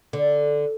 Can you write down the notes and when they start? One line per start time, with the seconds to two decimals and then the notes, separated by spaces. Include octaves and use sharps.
0.13 D3